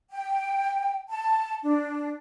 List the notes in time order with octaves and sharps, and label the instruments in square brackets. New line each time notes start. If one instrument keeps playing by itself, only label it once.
[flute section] G5
A5
D4